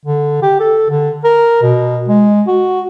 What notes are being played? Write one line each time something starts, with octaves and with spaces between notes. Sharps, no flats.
D3
G4
A4
D3
A#4
B2
G#3
F#4